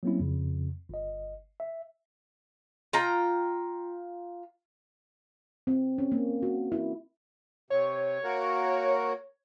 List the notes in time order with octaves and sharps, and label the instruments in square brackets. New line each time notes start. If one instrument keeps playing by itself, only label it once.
[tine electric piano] F#3 G3 A#3 C4 C#4 E4
F2 C#3
G1 D#5
E5
[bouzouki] F4 G5 A#5
[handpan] C4
C#4
A#3
F#4
E4
[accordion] C3 [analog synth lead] C#5
[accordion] A#3 F#4 A#4